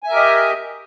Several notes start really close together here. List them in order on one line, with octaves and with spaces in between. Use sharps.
G#5 E5 A#4 G4 D#5